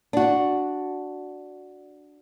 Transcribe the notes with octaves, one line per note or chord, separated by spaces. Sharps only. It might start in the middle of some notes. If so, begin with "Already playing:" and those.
D4 F#4